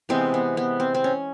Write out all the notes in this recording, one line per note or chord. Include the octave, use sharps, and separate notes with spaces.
C3 E3 G#3 B3 C4
B3
B3
C4
C4
C#4